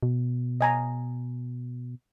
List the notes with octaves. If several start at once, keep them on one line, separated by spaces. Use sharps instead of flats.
B2
D#5 G#5 A#5